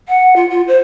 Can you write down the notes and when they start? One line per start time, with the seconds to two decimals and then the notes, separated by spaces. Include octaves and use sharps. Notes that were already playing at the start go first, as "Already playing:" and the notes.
0.08 F#5
0.36 F4
0.50 F4
0.68 C5